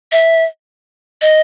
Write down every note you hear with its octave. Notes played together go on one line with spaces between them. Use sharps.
E5
D#5